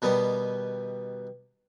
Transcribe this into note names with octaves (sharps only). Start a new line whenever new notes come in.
B2 D#3 G3 B3